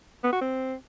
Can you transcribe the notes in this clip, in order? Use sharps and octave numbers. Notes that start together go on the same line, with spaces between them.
B3
F#4
C4